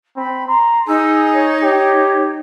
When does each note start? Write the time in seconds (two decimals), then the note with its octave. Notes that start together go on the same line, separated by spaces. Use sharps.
0.17 C4 B5
0.48 A#5 C6
0.88 D#4 G#4 E6
1.33 C#5
1.62 G4 C#5